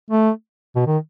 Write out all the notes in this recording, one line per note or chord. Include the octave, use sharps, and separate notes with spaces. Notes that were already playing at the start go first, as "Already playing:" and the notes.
A3
B2
D#3